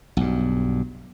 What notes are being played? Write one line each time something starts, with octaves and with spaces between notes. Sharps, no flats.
B1 G2